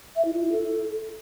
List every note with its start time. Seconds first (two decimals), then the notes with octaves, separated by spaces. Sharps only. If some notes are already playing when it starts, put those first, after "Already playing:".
0.16 E5
0.25 E4
0.34 F4
0.43 E4
0.52 A4